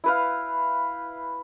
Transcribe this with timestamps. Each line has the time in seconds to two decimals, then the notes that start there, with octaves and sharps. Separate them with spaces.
0.04 E4 B4 F5